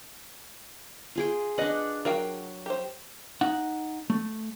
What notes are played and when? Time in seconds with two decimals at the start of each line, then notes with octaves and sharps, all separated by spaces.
1.15 F4 G#4 G5
1.58 D4 B4 D#5 F#5
2.05 F#3 A#4 F5 G5
2.66 G4 C5
3.41 D#4 F#5
4.10 A3